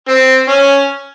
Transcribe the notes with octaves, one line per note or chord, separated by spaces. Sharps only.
C4
C#4